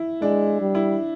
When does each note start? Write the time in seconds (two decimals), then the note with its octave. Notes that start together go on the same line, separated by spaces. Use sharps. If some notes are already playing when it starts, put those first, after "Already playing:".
Already playing: E4
0.21 G#3 D4
0.61 G3
0.75 E4